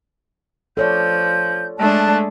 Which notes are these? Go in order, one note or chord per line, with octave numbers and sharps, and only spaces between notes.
F3 A4 C#5 D5 G6
G#3 A3 D4 A5 F#6